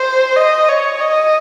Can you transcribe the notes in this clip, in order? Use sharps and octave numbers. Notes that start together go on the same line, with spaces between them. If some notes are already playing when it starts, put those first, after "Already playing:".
Already playing: C5
D#5
C#5
D#5